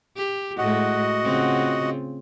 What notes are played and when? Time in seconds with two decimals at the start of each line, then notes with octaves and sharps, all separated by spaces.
0.17 G4
0.58 A2 G#3 A3 F#4 D#5 F#5
1.23 C#3 C4 F4